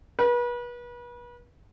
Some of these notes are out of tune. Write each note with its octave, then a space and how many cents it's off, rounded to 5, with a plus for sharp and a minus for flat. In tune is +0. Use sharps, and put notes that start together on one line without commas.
B4 -35